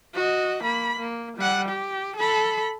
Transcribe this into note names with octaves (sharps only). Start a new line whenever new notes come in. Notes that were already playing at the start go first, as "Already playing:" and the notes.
F#4 D#5
A#3 B5
A#3
G3 F#5
G4
A4 B5